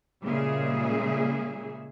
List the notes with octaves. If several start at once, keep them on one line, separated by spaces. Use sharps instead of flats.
A#2 C#3 G3 G#3 G#4 E5